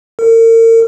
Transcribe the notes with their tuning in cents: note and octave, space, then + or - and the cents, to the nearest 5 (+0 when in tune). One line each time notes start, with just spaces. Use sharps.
A#4 -40